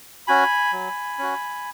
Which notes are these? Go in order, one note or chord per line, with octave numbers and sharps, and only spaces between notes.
C#4 F#4 G#5 B5
F#3
C#4 F#4